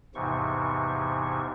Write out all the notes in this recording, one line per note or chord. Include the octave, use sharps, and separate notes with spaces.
E2 G#2 C3 E3 F3 C#6